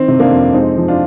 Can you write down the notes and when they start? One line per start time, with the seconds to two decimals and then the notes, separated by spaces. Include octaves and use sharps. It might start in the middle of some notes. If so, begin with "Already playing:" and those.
Already playing: D#3 C4
0.08 C3
0.20 A#3 D4
0.31 F2
0.54 G#3 C4 D#4
0.77 F3
0.88 D4 F4